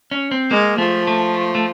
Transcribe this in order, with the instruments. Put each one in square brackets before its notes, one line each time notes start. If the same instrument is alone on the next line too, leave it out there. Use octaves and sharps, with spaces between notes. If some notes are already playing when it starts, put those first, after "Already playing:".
[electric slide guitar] C#4
C4
[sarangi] G#3 [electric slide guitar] A#3
[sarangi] F3 [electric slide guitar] A3
[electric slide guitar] A3
A3